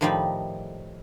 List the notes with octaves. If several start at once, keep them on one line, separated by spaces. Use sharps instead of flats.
A2 D#3 F3 G3 D#4 B5